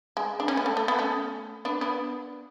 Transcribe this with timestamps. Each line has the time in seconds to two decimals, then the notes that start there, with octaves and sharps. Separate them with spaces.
0.17 G#3
0.40 D4
0.48 C#4
0.57 B3
0.66 A3
0.77 A3
0.88 B3
0.99 A3 C#4
1.65 B3 D4
1.81 B3 D4